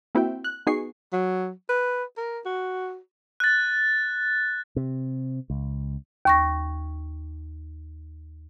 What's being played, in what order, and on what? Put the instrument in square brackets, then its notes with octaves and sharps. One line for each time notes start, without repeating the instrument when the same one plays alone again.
[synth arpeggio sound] A#3 C4 E4 F#4 E5 G5
F#6
B3 D#4 F#4 G#4 C#6 C7
[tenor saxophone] F#3
B4
A#4
F#4
[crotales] F#6 A6
[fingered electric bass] C3
C#2
[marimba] D#2 C#6 A#6